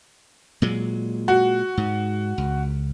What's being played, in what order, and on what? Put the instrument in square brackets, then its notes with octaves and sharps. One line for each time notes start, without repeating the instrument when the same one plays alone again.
[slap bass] A#2 F#3 G#3
[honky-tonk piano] F#4
[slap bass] G#2
C#2